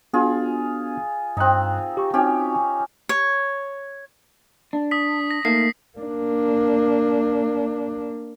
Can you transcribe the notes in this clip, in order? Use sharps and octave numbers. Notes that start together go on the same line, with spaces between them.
B3 D4 F4 F#4 G#4
G2 C4 D#4 D#6 F#6
G4 C#6
C4 C#4 D#4 F#4 G4
G#5
C#5
D4
D#6 B6
A#6
A3 A#3 D#4 C7
A#3 D4